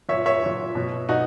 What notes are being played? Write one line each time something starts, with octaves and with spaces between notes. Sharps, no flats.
A#2 F#3 C#5 E5
C#5 E5
A#2 F#3
B2 F#3
B2 D#4 F#4